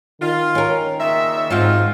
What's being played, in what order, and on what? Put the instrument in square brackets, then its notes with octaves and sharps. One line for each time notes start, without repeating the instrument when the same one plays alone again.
[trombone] D#3 [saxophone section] F4
[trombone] D#3 [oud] C#4 A#4
[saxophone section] A#2 C#3 E5
[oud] G#2 C4 F#4 [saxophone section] F3 D#4 F4